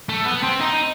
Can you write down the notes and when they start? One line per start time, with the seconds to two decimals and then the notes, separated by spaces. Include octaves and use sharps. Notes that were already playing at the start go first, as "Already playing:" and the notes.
0.09 A3
0.26 B3
0.43 C4
0.61 D#4